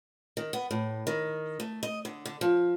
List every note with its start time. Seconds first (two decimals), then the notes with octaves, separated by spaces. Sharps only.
0.37 D#3
0.53 B3
0.71 A2
1.07 D#3
1.60 A3
1.83 D#5
2.05 D3
2.25 D3
2.41 F3